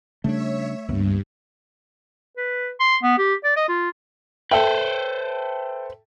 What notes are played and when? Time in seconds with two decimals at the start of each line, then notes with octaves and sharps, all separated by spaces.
0.24 C#3 G3 A3 D4 C#5 E5
0.88 C#2 G2 A#3 B3
2.37 B4
2.80 C6
3.03 B3
3.18 G4
3.44 D5
3.56 D#5
3.69 F4
4.51 A4 B4 C5 E5 G5